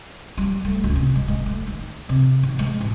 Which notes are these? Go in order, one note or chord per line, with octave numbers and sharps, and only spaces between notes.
G3
A3
C#2
C3
G#3
G#3
A3
D#3
C3
D#3
G#3
A1